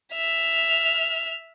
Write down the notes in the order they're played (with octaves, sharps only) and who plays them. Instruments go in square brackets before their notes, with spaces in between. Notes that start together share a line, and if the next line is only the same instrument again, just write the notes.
[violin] E5 F6